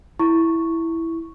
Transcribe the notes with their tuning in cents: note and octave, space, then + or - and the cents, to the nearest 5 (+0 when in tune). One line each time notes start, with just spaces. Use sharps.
E4 +0 C#6 +0